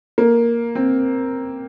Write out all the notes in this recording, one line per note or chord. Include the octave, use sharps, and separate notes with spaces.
A#3
C4